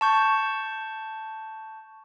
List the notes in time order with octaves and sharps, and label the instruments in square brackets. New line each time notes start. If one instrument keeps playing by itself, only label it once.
[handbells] A5 C#6 G6